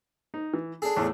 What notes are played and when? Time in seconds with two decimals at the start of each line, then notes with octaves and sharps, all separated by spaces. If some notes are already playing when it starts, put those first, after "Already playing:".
0.34 D#4
0.54 E3
0.82 D4 G#4 A4
0.97 E2 A2 A3